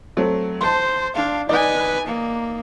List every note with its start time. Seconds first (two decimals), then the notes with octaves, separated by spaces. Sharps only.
0.17 F#3 A3 C4
0.61 C5 A5 C6
1.14 D4 F5
1.49 D#4 B4 D5 G#5
2.07 A#3